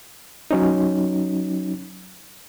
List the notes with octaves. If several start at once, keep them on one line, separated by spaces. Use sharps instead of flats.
F#3 C#4 D#4